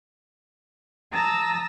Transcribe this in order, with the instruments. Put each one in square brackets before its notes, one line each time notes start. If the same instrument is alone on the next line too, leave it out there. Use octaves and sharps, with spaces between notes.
[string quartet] A5 A#5 D#6 E6 A#6